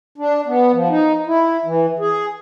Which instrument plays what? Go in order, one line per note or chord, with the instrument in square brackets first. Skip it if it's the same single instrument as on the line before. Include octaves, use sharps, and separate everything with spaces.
[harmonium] D4
B3
F3
D#4
E4
E3
G#4